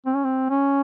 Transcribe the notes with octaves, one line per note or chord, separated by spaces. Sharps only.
C4
C#4
C4
C#4